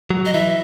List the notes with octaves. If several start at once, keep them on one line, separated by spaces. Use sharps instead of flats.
F#3
D#5
E3 E5